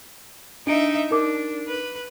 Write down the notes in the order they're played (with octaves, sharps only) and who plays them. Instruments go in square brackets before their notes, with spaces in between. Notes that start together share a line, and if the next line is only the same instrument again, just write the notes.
[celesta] D4 D7 [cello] D#4 E5
[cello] D4 [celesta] D#4 A#4 D6
[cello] B4